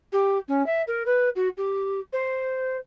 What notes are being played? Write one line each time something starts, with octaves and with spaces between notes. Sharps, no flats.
G4
C#4
E5
A#4
B4
F#4
G4
C5